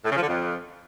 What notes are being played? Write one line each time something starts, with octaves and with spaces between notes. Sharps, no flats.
A2
C#3
F3
D3
F2